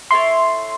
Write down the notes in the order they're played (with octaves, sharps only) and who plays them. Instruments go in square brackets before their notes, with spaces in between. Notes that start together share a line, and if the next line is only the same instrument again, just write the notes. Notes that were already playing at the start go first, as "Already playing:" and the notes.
[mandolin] E4 A4 C#5 [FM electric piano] C6